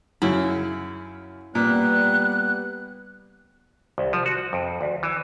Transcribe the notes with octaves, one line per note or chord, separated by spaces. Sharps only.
F#2 C#3 E4
A#2 G3 B3 F#6
C2
F3
F#4
F2
D2
E3